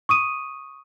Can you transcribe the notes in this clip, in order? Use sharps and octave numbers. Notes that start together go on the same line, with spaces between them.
C#6 D#6 D#7